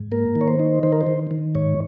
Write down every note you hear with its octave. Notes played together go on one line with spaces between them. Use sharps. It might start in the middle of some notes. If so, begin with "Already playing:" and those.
Already playing: G#2
A#3 A#4
D#3
C#5
C5
D#4
D#3 C5
A#4
C5
D#3
D#3
G#2 C#5